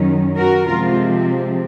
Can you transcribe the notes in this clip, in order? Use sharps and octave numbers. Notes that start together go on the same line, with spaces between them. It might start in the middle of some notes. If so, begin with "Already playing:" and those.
Already playing: F#2 D#3 F#3 C#4
F#4 A#4
C3 F3 G#3 C4 F4